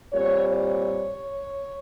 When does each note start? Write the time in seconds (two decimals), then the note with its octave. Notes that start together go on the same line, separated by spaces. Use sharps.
0.13 A#2 G3 C4 C#5
0.49 C#5